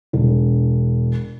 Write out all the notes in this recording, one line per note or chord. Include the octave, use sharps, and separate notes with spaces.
E1